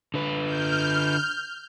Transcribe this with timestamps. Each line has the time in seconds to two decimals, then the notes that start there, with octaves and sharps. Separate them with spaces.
0.14 D3 B4
0.44 F6 G6